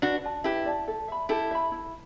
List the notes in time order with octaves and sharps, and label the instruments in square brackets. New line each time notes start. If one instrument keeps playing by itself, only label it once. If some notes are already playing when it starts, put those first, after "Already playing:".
[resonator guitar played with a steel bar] D4 F#4 [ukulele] B4
[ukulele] D5 A5
[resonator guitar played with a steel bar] E4 G4 [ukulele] B4
[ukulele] D5 A5
A4
E5 B5
[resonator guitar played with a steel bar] E4 G4 [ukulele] A4
[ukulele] E5 B5
E4